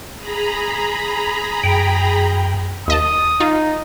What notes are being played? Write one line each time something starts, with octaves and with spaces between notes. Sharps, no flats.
G#4 A#5 B5
F#2 G5
D#2 D#5 A5 D#6
D#4 F4